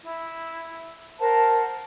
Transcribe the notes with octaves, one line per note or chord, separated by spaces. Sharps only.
E4
A#4 C5 F#5 A5